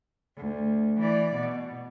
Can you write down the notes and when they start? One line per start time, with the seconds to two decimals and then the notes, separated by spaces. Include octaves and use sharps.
0.37 D2
1.00 E3 D5
1.36 B2